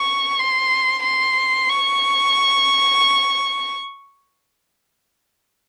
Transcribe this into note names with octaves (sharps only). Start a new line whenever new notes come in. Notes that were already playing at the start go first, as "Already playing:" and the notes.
Already playing: C#6
C6
C6
C#6